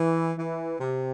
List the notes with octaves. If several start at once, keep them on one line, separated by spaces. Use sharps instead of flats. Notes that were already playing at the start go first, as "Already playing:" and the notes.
Already playing: E3
E3
C3